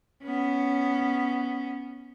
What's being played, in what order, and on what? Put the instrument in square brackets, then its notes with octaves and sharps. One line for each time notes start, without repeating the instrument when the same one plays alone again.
[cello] B3 C#4